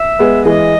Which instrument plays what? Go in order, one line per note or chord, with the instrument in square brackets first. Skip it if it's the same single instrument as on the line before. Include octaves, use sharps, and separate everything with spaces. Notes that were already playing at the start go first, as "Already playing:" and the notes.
Already playing: [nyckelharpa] E5
[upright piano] G#3 B3
[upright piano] E3 G#3 [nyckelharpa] D#5